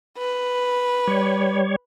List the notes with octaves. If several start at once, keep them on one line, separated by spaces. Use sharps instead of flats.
B4
G3 C#5